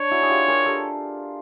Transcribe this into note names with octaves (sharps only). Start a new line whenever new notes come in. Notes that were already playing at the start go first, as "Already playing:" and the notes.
Already playing: D4 C#5
E4 F#4
G#4
F4 G4
G#4 A#4
G4 A4